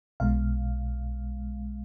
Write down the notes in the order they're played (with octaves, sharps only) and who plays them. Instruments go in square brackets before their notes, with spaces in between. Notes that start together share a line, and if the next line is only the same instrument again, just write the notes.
[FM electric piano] B1 B2 G#3 F5